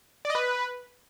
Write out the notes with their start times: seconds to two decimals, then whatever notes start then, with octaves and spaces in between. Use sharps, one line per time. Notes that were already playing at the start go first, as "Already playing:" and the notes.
0.25 D5
0.30 D#5
0.35 B4